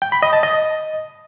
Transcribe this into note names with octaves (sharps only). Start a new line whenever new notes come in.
G5
B5
D#5
A5
D#5